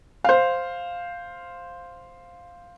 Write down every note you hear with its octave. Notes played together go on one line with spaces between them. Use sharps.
C5 F5